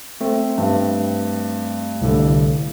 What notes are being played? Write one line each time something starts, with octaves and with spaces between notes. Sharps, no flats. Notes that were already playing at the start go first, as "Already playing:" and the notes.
A3 C4
G2
C2 A2 D3